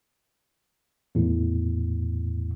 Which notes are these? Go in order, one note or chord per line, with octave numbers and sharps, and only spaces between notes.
E2 A2